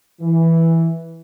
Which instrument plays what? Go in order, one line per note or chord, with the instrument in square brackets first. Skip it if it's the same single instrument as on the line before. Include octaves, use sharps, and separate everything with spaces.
[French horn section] E3